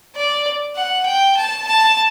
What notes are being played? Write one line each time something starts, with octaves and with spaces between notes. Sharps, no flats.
D5
F#5
G5
A5
A5